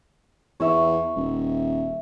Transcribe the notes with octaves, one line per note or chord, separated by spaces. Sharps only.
E2 C#5 E5
D#1